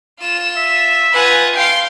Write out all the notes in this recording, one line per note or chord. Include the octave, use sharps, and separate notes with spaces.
F4 E7
E5
F4 B4 F#5 G#5
F5 G5 C6 C7